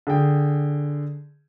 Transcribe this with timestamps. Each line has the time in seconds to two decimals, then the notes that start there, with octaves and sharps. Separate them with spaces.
0.07 D3 G#4 G5